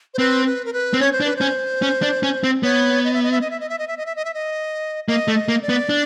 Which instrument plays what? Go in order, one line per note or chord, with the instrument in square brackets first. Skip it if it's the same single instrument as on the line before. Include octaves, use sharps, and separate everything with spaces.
[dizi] C5
[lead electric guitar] C4 [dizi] B4
[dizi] B4
A#4
B4
[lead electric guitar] C4
[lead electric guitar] C#4 [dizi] C#5
[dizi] C5
[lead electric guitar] D4
[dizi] B4
[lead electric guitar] C#4 [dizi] C5
[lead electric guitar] C#4
D4
C#4
C4
[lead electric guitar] B3 [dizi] C#5
[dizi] D#5
E5
D#5
E5
D#5
E5
D#5
E5
D#5
E5
D#5
E5
D#5
E5
D#5
[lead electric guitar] A#3 [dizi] D#5
[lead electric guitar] A3
[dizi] D#5
[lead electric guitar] A#3
[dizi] D5
[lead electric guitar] B3
D4